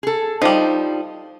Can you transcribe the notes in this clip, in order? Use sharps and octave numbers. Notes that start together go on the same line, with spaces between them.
G#4 A4
F3 G3 D#4